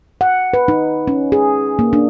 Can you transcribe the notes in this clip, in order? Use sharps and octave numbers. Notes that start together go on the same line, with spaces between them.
F#5
B4
D#4
C#4
G#4
A#3
D4